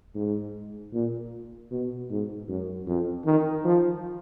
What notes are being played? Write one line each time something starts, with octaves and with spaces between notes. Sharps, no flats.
G#2
A#2
B2
G#2
F#2
F2
D#3
F3